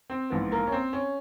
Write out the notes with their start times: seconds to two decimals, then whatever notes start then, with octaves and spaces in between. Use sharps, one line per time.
0.10 C4
0.30 A#1 G#2 E3 B3
0.52 A#3
0.67 C#4
0.72 C4
0.93 C#4